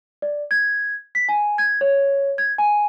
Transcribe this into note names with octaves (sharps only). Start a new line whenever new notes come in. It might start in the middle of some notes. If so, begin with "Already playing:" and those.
D5
G#6
B6
G#5
G#6
C#5
G#6
G#5